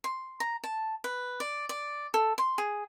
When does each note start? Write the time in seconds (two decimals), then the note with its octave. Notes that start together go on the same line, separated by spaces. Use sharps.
0.04 C6
0.40 A#5
0.64 A5
1.04 B4
1.40 D5
1.69 D5
2.14 A4
2.38 C6
2.58 G#4